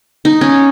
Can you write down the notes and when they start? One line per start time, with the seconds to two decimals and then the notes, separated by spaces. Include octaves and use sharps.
0.25 D#4
0.41 C#4